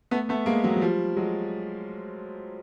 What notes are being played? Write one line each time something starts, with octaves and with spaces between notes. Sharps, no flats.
A3 B3
A3 B3
G#3 A#3
F#3 G#3
F#3
F3 G3
F#3 G#3